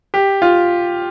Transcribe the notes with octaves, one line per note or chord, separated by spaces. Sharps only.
G4
F4